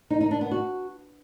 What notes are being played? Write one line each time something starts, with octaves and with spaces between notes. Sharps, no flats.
D#4
D#4
D4
B3
F#4